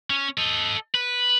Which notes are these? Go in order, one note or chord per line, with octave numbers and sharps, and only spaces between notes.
C#4
A4 D#5
B4